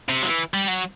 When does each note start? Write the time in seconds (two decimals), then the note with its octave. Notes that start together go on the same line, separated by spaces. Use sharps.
0.09 C3
0.22 F#3
0.27 E3
0.54 G3
0.68 F#3